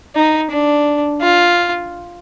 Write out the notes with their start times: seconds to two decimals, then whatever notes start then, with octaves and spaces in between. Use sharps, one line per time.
0.15 D#4
0.51 D4
1.21 F4